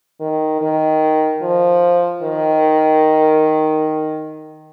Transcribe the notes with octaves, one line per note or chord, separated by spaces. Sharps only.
D#3
D#3
F3
D#3